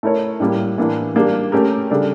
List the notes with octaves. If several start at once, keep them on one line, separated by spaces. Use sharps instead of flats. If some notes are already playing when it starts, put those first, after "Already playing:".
A3 E4 A#4 C#5
A2 G3 A#3
A2 E3 A#3 D4
G3 A#3 D4 G4
A3 C#4 G4 A#4
C#3 G3 D4 A4 D5